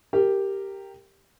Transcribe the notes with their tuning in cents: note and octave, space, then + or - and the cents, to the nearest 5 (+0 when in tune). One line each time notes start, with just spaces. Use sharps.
G4 +0 A#4 -15